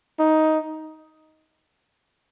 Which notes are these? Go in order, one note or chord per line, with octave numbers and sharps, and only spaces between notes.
D#4